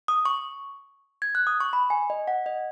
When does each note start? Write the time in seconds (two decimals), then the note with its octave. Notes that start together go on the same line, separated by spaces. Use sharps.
0.08 D#6
0.25 C#6
1.22 G#6
1.35 F#6
1.47 D#6
1.60 C#6
1.73 B5
1.90 G#5
2.10 D#5
2.28 F#5
2.46 D#5